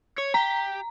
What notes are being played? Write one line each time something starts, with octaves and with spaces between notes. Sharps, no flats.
C#5
G4 A#5